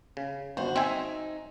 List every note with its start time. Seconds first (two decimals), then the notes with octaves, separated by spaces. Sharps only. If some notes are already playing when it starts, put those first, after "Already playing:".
0.17 C#3
0.57 G1 F#4 C5
0.76 C4 D#4 E5 G#5